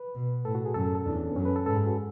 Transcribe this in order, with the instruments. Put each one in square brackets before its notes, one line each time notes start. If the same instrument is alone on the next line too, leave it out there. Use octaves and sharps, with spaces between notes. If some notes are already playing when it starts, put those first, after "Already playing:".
Already playing: [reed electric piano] B4
[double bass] B2
[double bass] A2 [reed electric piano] A4
[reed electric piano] F#4
G#4
[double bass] F#2 [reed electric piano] A4
[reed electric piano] A4
[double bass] E2 [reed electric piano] D4
[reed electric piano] C#4
B3
[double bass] F#2 [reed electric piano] C#4
[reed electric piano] A4
B4
A4
[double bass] G#2 [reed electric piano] A4
[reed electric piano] G#4
F#4